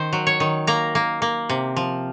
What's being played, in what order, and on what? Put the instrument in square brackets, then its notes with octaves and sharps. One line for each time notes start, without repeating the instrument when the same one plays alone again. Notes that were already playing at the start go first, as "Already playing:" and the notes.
Already playing: [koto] D#3 C5
F#3
C#5
D#3
A#3 A#5
A#3
A#3
C3
F3